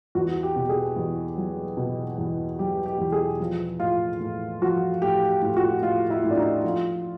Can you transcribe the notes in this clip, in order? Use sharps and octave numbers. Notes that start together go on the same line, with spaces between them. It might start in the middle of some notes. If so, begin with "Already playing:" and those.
E2 F#4
G4
B2
G#4
E2
F#3
B2
E2
F#3 G4
G4
E2
G#4
F3
A2 F4
A2
F3 F#4
A2 G4
G4
A2
F#4
A2 F4
E4
A2
D4
D#4
F3 F4